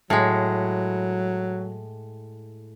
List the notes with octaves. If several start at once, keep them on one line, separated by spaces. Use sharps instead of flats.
A2 F#3 G#3